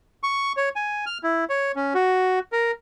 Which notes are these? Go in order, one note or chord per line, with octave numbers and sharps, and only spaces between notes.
C#6
C#5
G#5
F6
E4
C#5
C#4
F#4
A#4